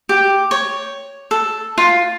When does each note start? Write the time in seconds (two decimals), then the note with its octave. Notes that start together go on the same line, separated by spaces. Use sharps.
0.09 G4
0.51 C#5
1.31 A4
1.78 F4